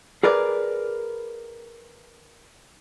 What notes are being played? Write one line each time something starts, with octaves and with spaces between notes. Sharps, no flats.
G#4 A#4 B4 D5